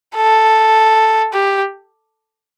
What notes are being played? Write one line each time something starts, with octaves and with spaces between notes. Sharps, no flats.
A4
G4